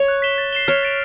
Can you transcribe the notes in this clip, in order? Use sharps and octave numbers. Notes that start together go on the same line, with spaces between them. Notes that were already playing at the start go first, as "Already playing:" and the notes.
Already playing: C#5
F#6
B6 E7 G7
A6
C7 E7 G7
C#5 F6
A6 D7 F7